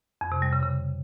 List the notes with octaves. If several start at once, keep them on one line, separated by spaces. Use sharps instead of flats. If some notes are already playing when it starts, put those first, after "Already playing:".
F2
C3
G3
C#3
C#3